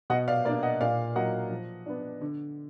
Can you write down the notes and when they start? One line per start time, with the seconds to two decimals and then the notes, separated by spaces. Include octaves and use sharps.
0.10 B2 D#5 F#5
0.28 D5 F5
0.45 A#3 D5 F5
0.49 D4
0.63 D#5 F#5
0.81 A#2 D5 F5
1.15 F#3 A#3 D#5 F#5
1.50 F3
1.86 B3 D4
2.21 D3